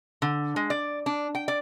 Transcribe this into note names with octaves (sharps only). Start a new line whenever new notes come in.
D3
G#3
D5
D4
G5
D5